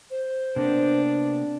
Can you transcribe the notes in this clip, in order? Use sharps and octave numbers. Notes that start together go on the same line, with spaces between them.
C5
C3 A#3 B3 D4